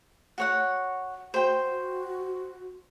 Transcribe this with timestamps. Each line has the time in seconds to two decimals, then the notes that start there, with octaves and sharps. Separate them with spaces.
0.38 F#4 C#5 F#5
1.34 F#4 C5 G5